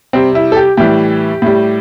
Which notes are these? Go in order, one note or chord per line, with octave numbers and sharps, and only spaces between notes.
C3 G3 C4
E4
A4
G4
A2 E3 G3 G4
A2 G3